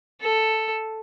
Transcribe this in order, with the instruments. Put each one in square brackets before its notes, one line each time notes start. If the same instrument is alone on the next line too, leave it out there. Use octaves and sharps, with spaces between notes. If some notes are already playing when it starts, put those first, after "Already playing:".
[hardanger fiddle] A4